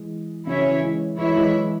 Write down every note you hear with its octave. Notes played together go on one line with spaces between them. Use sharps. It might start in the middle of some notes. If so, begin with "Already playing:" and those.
Already playing: E3 G#3
C#3 E3 F#3 C#4 E4 C#5 E5
E3 G#3
E3 F#3 G#3 E4 C#5 E5
E3 G#3
E3 G#3